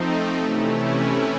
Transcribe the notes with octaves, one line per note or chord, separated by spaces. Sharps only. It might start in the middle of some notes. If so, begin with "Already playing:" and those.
Already playing: F3 A3 C4 D#4
C3 E3 A3 C#4 E4